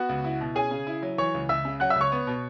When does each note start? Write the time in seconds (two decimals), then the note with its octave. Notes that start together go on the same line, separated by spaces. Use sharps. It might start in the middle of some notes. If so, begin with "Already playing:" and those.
Already playing: B3 F#4 F#5
0.09 C#2
0.24 E4
0.41 B2
0.55 C#4 G#4 G#5
0.71 C#3
0.87 E4
1.02 F#3
1.18 E3 C#5 C#6
1.34 C#2
1.49 C#2 E5 E6
1.65 C#3
1.80 F#3 F#5 F#6
1.90 E5 E6
1.96 C#2
2.01 C#5 C#6
2.12 B3
2.27 B2